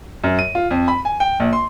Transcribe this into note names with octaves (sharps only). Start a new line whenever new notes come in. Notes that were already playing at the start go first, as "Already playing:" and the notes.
F#2
D#7
F4
F2
B5
G#5
G5
A#1
C6